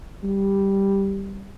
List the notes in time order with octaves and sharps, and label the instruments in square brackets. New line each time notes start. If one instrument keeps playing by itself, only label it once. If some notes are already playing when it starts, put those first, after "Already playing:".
[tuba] G3